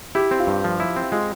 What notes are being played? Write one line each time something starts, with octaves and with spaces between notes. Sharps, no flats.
E4 G4
C4
F4
G2
F3
E4
C4
G#3 F4